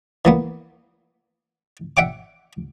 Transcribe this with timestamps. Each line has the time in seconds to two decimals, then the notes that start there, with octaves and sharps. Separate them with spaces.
0.25 E3 A#3 B3
1.97 E5 F#5 G5 D6